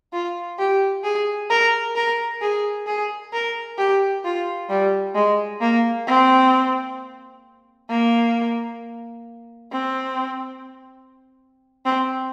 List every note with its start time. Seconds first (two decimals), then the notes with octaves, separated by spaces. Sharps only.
0.13 F4
0.59 G4
1.04 G#4
1.50 A#4
1.96 A#4
2.42 G#4
2.87 G#4
3.33 A#4
3.78 G4
4.24 F4
4.69 G3
5.15 G#3
5.61 A#3
6.07 C4
7.89 A#3
9.72 C4
11.85 C4